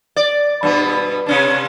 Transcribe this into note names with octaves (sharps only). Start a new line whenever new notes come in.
D5
G2 B2 B3
C3 C#4 D4